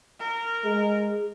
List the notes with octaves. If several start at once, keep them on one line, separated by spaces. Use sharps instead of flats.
A#4
G#3 G#4